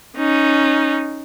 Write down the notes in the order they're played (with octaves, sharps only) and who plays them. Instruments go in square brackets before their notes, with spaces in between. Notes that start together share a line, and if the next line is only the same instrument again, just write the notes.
[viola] C#4 D#4